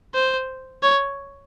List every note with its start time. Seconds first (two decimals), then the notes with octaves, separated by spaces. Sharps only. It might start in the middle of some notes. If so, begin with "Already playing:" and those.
0.14 C5
0.83 C#5